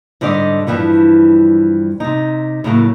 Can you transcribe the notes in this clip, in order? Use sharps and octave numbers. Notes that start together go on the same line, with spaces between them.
G#2 D3 G3 D5 D#5
G2 B2 E3 F3 G3
C3 D#4
A2 C#3 F#3 A3 A#3